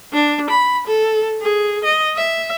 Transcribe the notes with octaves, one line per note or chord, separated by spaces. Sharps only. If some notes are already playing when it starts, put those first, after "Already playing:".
D4
B5
A4
G#4
D#5
E5